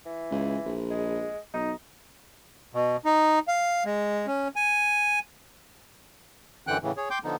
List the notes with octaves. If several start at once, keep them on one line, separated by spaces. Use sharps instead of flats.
E3
C#2
A#1
G#3
B1 D#4
B2
D#4
F5
G#3
C#4
G#5
F#2 D3 E3 F#5 G5 F#6
A2 C#3 E3
G#4 C#5
G5 C6 D6 G6
D3 F3 B3 D#4